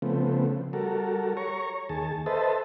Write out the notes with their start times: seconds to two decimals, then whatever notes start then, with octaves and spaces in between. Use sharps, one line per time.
0.02 C#3 F3 A3 B3 C4
0.73 G3 F#4 A4 A#4
1.37 C#5 A#5 C#6
1.89 D#2 G#4 A5
2.26 A4 B4 C5 D#5 E5 A5